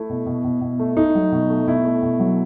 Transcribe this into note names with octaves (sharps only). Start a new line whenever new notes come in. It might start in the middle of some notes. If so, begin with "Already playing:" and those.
Already playing: A3 E4
B2
B2
B2
B2
A3
A3 D#4
F#3
B2
A3
B2 E4
A3
B2
F#3